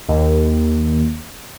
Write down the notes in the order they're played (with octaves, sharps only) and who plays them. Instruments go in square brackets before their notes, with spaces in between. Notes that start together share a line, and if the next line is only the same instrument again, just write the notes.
[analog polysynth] D#2